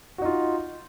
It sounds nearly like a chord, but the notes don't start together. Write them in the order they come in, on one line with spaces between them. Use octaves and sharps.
F#4 D#4 F4